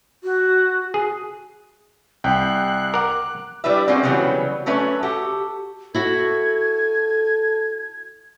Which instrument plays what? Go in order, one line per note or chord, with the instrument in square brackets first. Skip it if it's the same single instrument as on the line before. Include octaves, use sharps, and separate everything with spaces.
[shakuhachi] F#4
[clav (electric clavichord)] G#4
[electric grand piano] C2 G5 [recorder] F#6
[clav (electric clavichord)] A#4 F#5 [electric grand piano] D6
[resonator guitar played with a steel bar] G3 D4 E4 B4 E5
G#3 A#3 C4 C#4 F4 F#4
C#3 E3 F#3 G3 B3 C4
F#3 A3 C#4 B4 E5
F#4 G4 A4
[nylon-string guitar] E4 F#4 [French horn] A4 [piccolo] G#6